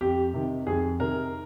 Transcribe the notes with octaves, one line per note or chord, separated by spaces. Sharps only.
F2 G4
C3 D#3
F2 G#4
C3 D#3 A#4